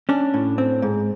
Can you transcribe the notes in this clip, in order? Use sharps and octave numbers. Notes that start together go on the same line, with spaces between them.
C#4 D4
A2
C4
G#2